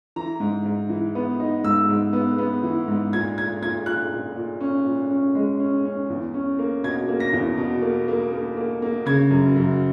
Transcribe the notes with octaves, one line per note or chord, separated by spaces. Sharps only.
E3 A#5
G#2
G#2
E3
B3
D#4
G#2 E6
G#2
B3
B3
E3
G#2
A#2 G#6
A#2 G#6
A#2 G#6
A#2 F#6
A#2
A#2
C#4
A#2
C#4
G#3
C#4
C#4
E2
C#4
A#3
B2 G#6
A#3
A#6
E2
B2
A#3
A#3
A#3
A#3
A#3
C#3 G#6
F#2
F#2